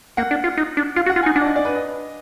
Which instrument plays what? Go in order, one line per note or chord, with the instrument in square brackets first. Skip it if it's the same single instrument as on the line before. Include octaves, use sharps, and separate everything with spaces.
[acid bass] A#3 [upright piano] F#5
[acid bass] D4
F4
D#4
D4
[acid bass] F4 [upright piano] F5
[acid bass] F#4
[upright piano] F#5
[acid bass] F4
[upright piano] G#5
[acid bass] D#4
[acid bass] D4 [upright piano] F#5
[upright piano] D5
D#5
D5
B4
D#5